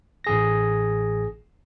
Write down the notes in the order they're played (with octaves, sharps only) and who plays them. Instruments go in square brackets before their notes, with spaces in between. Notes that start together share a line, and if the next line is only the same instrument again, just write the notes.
[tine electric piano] A1 G#4 A#6